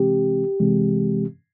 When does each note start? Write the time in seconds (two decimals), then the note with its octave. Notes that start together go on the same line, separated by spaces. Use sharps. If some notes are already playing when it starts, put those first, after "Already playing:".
Already playing: C3 E3 G#3 C4 G4
0.60 C3 E3 G#3 C4